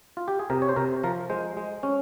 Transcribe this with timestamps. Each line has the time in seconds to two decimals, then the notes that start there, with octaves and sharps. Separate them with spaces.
0.17 F4
0.28 G4
0.39 G#4
0.50 C3 A#4
0.62 C#5
0.69 C5
0.76 C3 A#4
1.04 F3 A#4
1.30 G#3 C5
1.57 G#3
1.83 C#4